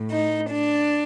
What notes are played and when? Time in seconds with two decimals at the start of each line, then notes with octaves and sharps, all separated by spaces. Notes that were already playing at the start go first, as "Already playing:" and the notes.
Already playing: A2
0.10 D#4
0.50 D4